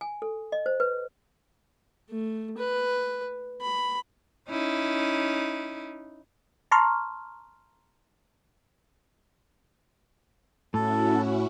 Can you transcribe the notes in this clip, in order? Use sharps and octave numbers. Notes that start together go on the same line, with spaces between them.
G#5
A4
D#5
C5
B4
A3
B4
B5
C#4 D#4 E4
A5 A#5 C6 C#6 F6
A2 C#4 E4 F#4 A4